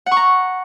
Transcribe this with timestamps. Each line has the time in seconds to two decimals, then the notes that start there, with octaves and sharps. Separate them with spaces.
0.06 F#5
0.11 C#6
0.17 A#5